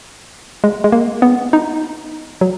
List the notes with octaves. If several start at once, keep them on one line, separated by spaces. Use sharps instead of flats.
G#3
G#3
A#3
B3
D#4
F#3